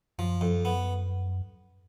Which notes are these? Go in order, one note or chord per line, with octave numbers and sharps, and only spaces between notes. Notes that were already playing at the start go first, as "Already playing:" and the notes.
F#2 F3
F2
B3